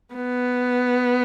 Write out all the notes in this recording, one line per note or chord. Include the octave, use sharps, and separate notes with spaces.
B3